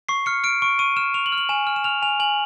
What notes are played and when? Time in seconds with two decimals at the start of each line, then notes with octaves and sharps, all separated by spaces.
0.09 C#6 C7
0.26 F6 C#7
0.44 F6 D7
0.62 C#6 D7
0.79 C#6 D#7
0.97 F6 E7
1.14 C#6 F7
1.26 F#7
1.32 F6
1.38 F#7
1.49 G#5 E7
1.67 F6
1.76 E7
1.84 F6 F7
2.02 G#5 F7
2.20 G#5 F#7